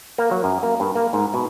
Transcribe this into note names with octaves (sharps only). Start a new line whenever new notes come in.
A#3
F#3
F#2
A#3
G2
A#3
G#2
B2